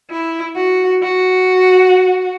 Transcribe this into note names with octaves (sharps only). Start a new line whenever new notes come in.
E4
F#4
F#4